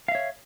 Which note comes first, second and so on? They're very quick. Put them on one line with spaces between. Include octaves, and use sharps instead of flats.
F5 E5 C#5